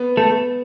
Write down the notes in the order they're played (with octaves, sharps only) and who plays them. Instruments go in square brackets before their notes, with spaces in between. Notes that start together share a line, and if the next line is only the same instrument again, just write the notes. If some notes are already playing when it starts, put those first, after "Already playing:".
Already playing: [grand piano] B3
[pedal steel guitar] A3 A4